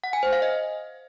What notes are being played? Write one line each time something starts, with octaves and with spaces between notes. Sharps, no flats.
F#5
G#5
C5
F5
D#5